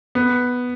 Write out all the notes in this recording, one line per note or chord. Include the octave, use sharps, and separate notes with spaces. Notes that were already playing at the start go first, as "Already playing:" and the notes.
B3